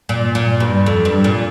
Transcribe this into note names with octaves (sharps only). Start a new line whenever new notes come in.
A#2
A#2
G2
F2
G2
A#2